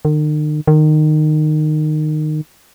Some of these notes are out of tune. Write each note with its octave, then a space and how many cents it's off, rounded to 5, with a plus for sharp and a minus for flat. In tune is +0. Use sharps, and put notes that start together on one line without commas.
D#3 -45
D#3 -20